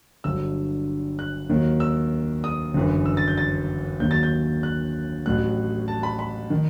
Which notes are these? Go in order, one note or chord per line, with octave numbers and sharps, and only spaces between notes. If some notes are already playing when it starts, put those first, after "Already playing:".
G1 G2 F#3 E6
F#6
D#2 D#3 F#3
E6
D#6
G1 F#2 E3
E6
A6
G6
A6
D#2 D#3 F#3 G6
A6
G6
F#6
A1 A2 F#3 F#6
A5
B5
B5
D#3